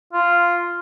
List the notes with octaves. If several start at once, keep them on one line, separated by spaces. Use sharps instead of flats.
F4